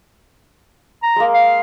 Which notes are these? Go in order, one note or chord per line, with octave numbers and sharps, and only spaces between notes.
A#5
G#3 A#3
F5